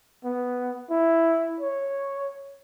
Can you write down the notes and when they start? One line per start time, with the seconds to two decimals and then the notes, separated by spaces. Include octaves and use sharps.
0.24 B3
0.90 E4
1.60 C#5